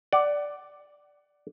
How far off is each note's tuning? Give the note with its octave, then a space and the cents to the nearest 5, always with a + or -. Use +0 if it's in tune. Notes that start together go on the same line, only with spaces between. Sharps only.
D5 +0 F#5 +25